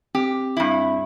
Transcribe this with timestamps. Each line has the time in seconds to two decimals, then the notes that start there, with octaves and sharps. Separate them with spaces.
0.15 C4 G4
0.57 G2 E4